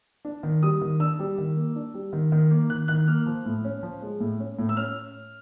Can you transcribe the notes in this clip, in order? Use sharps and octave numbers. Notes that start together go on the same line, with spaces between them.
D4
D#3
G3 D#6
D#3
D4 E6
G3
D#3
A#3
D4
G3
D#3
D#3
A#3
D#3 F#6
D#3 F#6
A#3 F6
F3
A2
C#4
F3
G#3
A2
C#4
A2
E6
C#4 F6